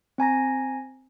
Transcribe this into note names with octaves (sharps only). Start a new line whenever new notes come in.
C4 G#5 A#5 A#6